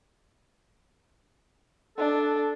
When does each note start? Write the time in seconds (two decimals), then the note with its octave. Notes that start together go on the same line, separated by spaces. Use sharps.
1.98 D4 A4